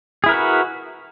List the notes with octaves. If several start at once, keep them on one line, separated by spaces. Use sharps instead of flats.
E4 F#4 G#4 A#4 B4